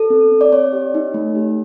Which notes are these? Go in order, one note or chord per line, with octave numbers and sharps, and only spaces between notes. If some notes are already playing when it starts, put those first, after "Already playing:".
Already playing: A4
C4
C4
D5
C4 C#5
G4
D#4
A3
G4